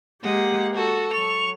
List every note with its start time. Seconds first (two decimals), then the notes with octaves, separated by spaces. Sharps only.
0.23 G#3 A#3 G4 F#5
0.75 F#4 A4
1.13 F#3 C#6 F7